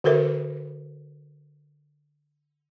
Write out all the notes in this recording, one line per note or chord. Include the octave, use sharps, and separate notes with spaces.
D3 F#4 A4 A#4 C5 E5